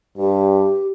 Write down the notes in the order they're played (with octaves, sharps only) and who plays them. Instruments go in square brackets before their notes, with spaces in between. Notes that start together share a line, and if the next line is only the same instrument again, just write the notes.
[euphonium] G2 [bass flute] G4